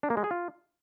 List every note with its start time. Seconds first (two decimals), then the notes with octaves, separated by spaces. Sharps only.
0.03 D4
0.10 A#3
0.17 G#3
0.24 G#4
0.31 F4